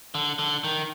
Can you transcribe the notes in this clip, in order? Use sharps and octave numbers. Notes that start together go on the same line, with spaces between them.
D3
D3
D#3